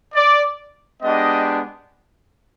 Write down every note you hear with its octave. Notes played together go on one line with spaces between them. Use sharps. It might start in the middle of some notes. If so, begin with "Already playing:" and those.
D5
G#3 B3 D4 G4 D#5